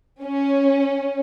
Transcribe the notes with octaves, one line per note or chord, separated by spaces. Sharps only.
C#4